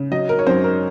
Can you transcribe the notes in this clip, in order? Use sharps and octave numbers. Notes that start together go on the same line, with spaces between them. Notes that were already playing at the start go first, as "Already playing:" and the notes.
Already playing: C#3
F#3 D#5
A#4
C#5
F#2 C5
A#4